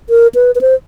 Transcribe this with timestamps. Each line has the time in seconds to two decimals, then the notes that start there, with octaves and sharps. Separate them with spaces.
0.10 A#4
0.35 B4
0.55 B4
0.61 C5